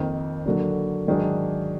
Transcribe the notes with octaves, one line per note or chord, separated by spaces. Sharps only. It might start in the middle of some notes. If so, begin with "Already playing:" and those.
Already playing: F2 D#3 A#3
D3 F#3 A#3 D4
G#2 D#3 F#3 D4 G#4